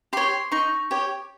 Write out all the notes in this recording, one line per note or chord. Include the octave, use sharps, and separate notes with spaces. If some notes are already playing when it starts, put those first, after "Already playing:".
G4 C#5 C6
D#4 C#6
G4 C#5